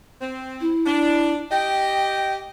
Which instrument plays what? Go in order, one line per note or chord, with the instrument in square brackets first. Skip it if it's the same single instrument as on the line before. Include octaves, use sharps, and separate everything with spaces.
[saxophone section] C4
[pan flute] E4
[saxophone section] D4
[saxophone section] G4 D#5 [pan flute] G5